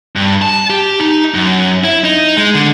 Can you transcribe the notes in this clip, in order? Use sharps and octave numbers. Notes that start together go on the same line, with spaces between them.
G2
A5
G4
D#4
F#2
E4
D#4
G#3
D3